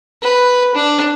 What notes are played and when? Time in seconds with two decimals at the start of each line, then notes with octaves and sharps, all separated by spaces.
0.22 B4
0.75 D4